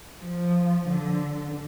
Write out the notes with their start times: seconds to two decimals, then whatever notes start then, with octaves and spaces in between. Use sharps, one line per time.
0.20 F3
0.89 D3